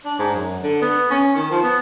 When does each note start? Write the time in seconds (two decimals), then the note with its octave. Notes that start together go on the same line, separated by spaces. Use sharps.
0.05 D4
0.19 G#2
0.35 F#2
0.63 D3
0.82 B3
1.11 C#4
1.36 D#3
1.51 F3
1.63 B3